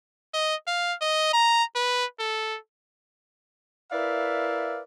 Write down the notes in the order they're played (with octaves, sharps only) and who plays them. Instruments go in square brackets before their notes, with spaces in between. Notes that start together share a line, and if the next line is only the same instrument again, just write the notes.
[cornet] D#5
F5
D#5
A#5
B4
A4
[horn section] E4 A#4 B4 D5 E5 F5